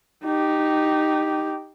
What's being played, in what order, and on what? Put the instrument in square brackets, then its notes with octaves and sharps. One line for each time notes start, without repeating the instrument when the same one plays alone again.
[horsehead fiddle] D#4 G4